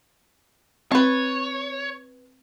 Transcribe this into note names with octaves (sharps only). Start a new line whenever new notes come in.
C4 B4 C#5 A5